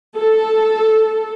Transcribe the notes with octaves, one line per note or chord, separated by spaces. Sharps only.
A4